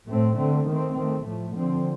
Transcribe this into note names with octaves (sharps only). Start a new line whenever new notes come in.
A2 A3 C4
D3 A3 C4
D#3 A3 C4
D#3 A3 C4
A2 F3 A3
D3 F3 C4